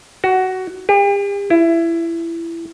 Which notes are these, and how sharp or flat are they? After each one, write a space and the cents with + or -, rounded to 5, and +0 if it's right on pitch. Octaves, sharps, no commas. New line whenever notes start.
F#4 +15
G4 +45
E4 +20